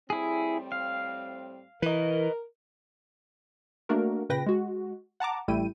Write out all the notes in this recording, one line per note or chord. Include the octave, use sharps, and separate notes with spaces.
A2 G3 C4 E4 G#4
F5
E3 A#4 B4 D#5
A3 A#3 D4 F#4 A#4
A#2 C#3 B4 G5 A#6
G#3 F#4
F#5 A5 A#5 D6
A1 G3 A3 E4 G5 D#7